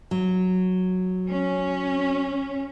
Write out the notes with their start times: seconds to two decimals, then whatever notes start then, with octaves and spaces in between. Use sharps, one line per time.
0.11 F#3
1.29 C#4